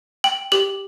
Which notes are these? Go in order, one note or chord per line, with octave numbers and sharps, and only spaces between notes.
G5 F#7
G4 F#7